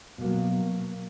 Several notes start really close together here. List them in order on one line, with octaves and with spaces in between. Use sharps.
B2 A#3 F#3